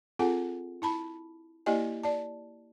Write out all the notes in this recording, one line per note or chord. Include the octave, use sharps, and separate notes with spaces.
C4 F4 G#4 A4 F#5 G#5
E4 A5 B5
A#3 E4 G4 D5 D#5 G#5
D5 A5